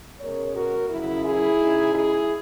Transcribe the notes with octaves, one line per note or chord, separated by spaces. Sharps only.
B2 G#3 C#4 A#4 C#5
F#4 A#4
F#2 C#3 F#3 E4
E4 G#4
C#3 G#3 D#4
E4 G#4